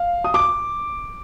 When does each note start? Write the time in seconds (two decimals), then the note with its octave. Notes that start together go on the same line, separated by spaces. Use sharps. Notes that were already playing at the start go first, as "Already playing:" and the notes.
Already playing: F5
0.24 D#6
0.34 D6